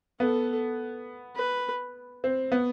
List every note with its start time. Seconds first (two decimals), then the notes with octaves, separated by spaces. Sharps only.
0.20 B3 A4
1.36 B4
2.24 C4
2.52 B3